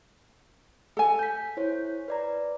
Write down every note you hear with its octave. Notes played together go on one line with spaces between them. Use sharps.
A4 G#5
G6 B6
E4 C5 C#5
B4 D5 A#5